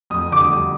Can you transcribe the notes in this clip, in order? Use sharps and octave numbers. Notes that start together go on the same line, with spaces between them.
F2 D#6
D3 D6
D#6
G3